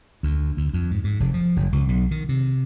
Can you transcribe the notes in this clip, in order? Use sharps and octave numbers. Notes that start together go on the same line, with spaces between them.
D2
D2
F2
G#2
G#2
F1
F3
F#1
C#2
B1
D#3
C3